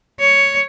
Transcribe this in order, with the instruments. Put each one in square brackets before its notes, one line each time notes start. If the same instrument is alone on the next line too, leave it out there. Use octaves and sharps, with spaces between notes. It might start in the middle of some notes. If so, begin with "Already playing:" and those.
[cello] C#5